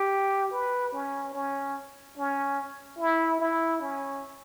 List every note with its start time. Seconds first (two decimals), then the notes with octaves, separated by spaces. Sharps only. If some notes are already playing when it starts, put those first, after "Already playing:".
Already playing: G4
0.51 B4
0.93 C#4
1.34 C#4
2.17 C#4
2.99 E4
3.40 E4
3.82 C#4